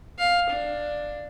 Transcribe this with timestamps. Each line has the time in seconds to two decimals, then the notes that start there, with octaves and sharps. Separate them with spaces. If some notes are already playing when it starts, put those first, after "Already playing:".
0.19 F5
0.50 D4